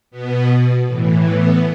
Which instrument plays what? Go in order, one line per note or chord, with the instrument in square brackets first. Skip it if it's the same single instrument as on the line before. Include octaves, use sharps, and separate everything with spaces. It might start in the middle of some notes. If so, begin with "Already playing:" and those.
[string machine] B2 B3
A2 E3
B3